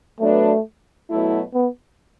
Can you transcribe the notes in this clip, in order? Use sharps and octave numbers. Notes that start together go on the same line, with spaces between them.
F#3 A3 B3 D4 F#4 B4
B2 F#3 A3 E4
B3